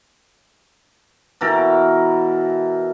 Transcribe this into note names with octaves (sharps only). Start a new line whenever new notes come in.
B2 E3 A4 A#4